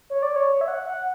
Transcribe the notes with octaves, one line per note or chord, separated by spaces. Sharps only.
C#5
D5
C#5
E5
F#5
F#5